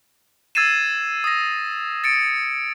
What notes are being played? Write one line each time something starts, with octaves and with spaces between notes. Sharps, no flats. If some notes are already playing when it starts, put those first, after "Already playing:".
E6 G#6 A6 C7 D#7 E7
D#6 A#6
A6 C#7 D7